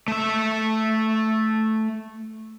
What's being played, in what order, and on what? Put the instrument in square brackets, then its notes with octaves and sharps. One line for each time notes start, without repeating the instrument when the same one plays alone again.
[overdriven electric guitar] A3 E5